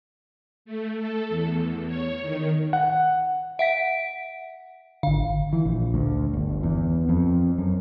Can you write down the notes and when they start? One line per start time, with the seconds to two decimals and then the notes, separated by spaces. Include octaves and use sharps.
0.65 A3
0.97 A4
1.29 E2
1.87 C#5
2.21 D#3
2.73 F#5
3.59 E5 F#5 B6 D7
5.03 G#1 D3 F5
5.53 E3
5.65 A#1
5.94 D2
6.33 G1
6.63 E2
7.09 F2
7.58 F#2